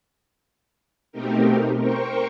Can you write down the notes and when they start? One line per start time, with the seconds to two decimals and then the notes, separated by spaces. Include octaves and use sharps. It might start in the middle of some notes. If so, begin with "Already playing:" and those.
1.12 B2 A3 C4 D#4 G4 A#4
1.75 A#4 C5 G5 C#6